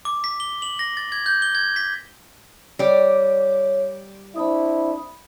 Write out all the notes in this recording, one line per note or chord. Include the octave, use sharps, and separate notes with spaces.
D6
B6
G7
F#7
A#6
A6
G#6
G6
G7
G#6
B6
G3 C#5 D5
C4 D4 E4 B5 D#6